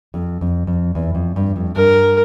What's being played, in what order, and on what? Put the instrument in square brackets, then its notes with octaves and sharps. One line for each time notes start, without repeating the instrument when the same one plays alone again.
[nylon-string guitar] F2
F2
F2
E2
F2
G2
F2
[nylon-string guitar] G2 [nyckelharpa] A#4